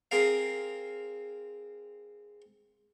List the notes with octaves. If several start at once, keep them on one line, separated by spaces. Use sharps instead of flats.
C4 G#4 A#4 F5